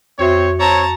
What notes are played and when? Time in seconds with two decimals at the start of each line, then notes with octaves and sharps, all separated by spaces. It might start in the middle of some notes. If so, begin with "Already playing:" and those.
0.19 F2 C4 F#4 C5 C#5 E5
0.60 C4 C#5 A5 A#5